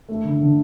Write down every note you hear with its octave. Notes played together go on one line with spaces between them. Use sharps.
A3
D3
D3